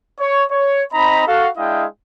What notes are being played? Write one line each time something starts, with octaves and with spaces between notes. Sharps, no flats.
C#5
C#5
C4 D#4 D#5 A#5 B5
F#4 A4 F5
G#3 D4 E4 D#5 F5 G5